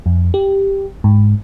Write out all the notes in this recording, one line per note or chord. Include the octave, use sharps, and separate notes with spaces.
F2
G4
G#2